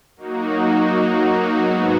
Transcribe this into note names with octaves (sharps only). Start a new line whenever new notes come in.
F#3 A#3 D#4 F#4
G#2 F#3 B3 D#4 F#4